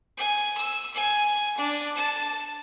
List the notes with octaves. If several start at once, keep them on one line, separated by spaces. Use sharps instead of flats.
G#5
E6
G#5
D4
A5